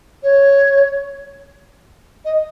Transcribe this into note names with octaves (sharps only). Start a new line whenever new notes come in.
C#5
D#5